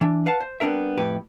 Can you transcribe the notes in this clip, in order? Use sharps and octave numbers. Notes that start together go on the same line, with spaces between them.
E3 D4
B4 F5 F#5 A5
C5
G3 B3 C4 D4 A#4 E5
F2 A2 G4 B4